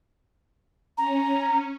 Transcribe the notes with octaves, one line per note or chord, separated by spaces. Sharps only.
C#4 A#5